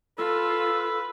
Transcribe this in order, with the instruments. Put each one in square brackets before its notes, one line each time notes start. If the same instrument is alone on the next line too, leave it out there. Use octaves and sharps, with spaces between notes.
[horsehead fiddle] F4 [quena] A4 [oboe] B4 [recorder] E6